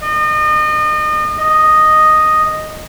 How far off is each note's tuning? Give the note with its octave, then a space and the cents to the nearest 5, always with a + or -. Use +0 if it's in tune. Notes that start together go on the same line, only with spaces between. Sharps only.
D#5 -35
D#5 -5